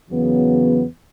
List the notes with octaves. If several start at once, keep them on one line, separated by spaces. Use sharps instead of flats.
E2 C#3 F#3 B3